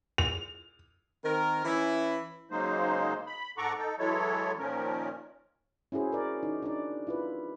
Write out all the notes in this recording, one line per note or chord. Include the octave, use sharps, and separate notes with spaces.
F7
D#3 C4 A#4
E3 C#4 E4
C#3 F#3 G#3 A#3 D#4 C5
B5
G#2 A4 F#5 A#5 C#6 D6
D#4 A4
E3 F#3 G#3 E4 A4 C#5
A#2 D#3 F3 C#4 A#4
C#4 E4 F#4 G#4 C5
A#4 D5
D#4
D4 D#4 D5
E4 F4 B4